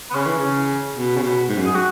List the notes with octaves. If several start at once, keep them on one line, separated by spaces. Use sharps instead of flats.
B3
C#3 C#4
E3
C#3
B2
C#3
B2
G#2
F#2
G#4
F#4